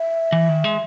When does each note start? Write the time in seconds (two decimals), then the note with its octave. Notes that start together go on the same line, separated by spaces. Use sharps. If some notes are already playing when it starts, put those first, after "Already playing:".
Already playing: E5
0.32 E3
0.49 D#3
0.64 G#3